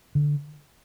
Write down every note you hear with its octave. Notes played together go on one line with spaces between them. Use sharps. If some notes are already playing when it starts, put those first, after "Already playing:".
D3